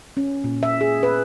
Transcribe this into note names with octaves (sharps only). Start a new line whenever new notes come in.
C#4
A#2
E5
G#4
B4